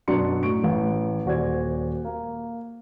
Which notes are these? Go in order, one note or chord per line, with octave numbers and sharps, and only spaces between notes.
F#2 B2 D4 D5 C6 C#7
A2 C#6 D7
A1
D#1 F#4 C5 D5 G#6
A#3